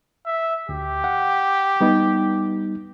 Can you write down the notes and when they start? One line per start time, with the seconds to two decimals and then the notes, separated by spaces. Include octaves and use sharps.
0.26 E5
0.69 D2 G4
1.04 F#5
1.81 G3 B3 D#4